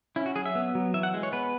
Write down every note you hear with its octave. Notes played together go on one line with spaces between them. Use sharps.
C#4 E4
F#4
F#3 G#4
E5
B3
F#3
E3 E5
F#5
G#3
C#5
B3 B4